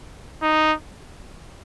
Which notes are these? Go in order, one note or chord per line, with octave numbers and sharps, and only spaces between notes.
D#4